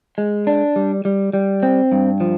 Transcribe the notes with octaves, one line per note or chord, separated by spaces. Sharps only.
G#3
D4
G3
G3
G3
C4
G2
F3